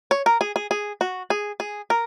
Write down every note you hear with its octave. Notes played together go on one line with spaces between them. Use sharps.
C#5
A#4
G#4
G#4
G#4
F#4
G#4
G#4
A#4